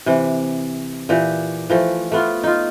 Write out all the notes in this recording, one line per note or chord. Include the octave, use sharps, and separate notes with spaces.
C3 E3
A#2 E3 G4
E3 F3 A3
A3 B3 F4
D#4 F4